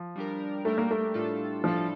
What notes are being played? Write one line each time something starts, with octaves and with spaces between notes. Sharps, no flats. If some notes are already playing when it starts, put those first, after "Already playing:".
Already playing: F3
G3 D4 G4 A#4
G3 A3 D4 G4 A#4
A#3
A3
A2 G3 D4 F4 A4
A2 F3 G3 D4 F4 A4